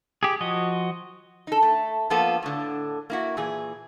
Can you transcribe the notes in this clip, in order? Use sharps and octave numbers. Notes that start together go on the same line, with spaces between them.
G4 G#4
F3 F#4 D#5
D#4 A4
A3
F3 A#3 B3 F4 A4
A2 D3
A#3 E4 F#4
A#2 E3 G#4